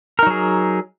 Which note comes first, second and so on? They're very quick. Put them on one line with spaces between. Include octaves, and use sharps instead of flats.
A#4 D#4 F#3 G#4